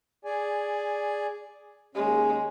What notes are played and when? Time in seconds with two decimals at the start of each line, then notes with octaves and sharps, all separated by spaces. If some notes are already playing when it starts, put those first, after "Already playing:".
0.25 G#4 D5 G#5
1.95 D#2 G#3 C#4